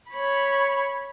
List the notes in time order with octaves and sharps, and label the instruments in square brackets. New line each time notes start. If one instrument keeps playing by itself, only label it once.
[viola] C#5 B5